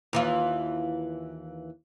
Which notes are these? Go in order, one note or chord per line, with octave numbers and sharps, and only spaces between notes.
D#2 E3 F4